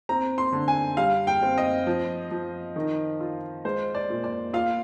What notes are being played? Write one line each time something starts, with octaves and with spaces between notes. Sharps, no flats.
C4 A#5
C6
D3
G#5
G3 F5
G5
C4
D#5
F3
F3
D#3
F4
G#3 C5
D5
A#2
D5
F4 F5